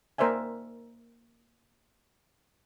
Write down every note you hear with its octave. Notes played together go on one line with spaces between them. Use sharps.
A#3 A#4 C5 D5 E5 G#5